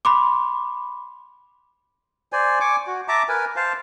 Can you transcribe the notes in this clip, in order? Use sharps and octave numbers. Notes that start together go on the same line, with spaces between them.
B5 C6 D6
C5 D5 G#5
G#5 C#6 D6
F#4
E5 A5 A#5 D6
A#4 B4 G#5
C5 F5 A5